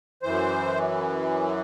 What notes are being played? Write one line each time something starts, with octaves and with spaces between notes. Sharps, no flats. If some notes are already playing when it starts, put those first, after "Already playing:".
F#2 E3 C5